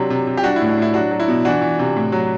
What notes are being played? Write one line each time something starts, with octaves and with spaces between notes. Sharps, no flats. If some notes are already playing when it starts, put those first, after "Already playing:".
Already playing: C3 F#3 D4
C3
C3
G4
G3 D4 F#4
E4
A2
D4
A2 E4
F#3 D4 F#4
F#3
E4
B2
E3 D4 F#4
E3
C3
A2
F#3